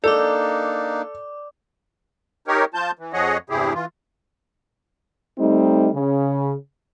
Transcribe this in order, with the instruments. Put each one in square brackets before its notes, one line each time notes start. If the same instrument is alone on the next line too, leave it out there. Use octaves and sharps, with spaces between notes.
[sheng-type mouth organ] A#3 D4 D#4 [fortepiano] A4 [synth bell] D5 D6
[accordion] D#4 G4 A#4 C#5
F3 F4 A5 G6
E3
F2 F3 G#4 C#5 D#5 F#5
E2 G2 C3 E4 G4 G#4
E3 F4
[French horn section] G3 A3 C4 D#4
C#3